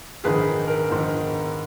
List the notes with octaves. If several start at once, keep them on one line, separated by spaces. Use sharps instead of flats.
A#1 G#2 D#3 G#4 B4
A#4
A#1 G#2 D#3